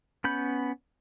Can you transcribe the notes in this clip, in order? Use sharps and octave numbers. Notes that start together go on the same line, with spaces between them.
B3 C#4 B5 G6